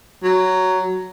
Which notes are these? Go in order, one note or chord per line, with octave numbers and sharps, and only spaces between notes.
F#3